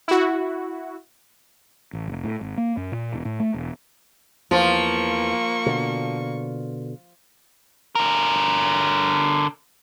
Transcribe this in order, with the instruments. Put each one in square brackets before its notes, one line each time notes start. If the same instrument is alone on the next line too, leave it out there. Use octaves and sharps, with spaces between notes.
[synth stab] E4 F#4
[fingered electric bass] A1
F1
A2
G#1
A#3
F#2
A#2
E1
A2
A3
E1
[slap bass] E2 [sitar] F3 [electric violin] A#3 C#6
[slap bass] B2 D3
[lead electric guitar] D3 A#4